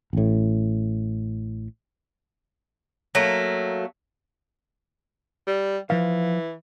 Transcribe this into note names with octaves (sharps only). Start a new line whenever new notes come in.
A1 A2
F#3 A3 A#3
G3
E3 F3 F5